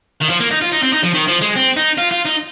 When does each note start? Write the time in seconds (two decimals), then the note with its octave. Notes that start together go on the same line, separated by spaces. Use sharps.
0.21 D#3
0.30 F3
0.40 A#3
0.51 D#4
0.61 F4
0.72 D#4
0.83 C4
0.93 D#4
1.03 F3
1.14 D#3
1.28 F3
1.42 G#3
1.56 C4
1.77 D#4
1.98 F4
2.11 F4
2.26 D#4